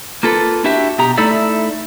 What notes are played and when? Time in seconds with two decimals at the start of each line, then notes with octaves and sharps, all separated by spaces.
0.23 A#3 F4 A4 B4
0.64 D4 E4 F#4 G4 E5
0.98 B2 G4 A#5
1.17 A3 D#4 E4 A4 D5 E5